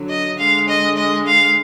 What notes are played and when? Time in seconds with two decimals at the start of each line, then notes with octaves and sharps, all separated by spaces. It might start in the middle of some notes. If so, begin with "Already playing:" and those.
Already playing: D3 F#3
0.09 D#5
0.38 D3 G#3 F5
0.68 D#5
0.97 D#5
1.26 F5